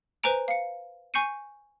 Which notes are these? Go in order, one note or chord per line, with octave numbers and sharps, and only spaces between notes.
B4 C5 G#5 A#5 D7
F5 C#7
G#5 C#6 G6 C7 C#7 D#7